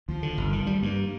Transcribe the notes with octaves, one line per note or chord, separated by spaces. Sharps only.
D#2 F3
D3
G1
D#3
G3
G2 A#3